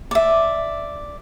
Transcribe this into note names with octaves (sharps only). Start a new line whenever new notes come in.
D5 E5